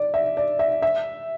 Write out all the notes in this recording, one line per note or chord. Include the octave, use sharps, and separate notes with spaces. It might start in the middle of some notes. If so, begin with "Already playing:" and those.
Already playing: D5
E5
D5
E5
E5